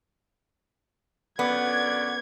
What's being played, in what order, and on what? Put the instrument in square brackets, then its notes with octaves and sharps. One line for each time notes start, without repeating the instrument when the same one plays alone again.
[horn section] F#2 D3 D5 [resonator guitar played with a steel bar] B3 [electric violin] G#6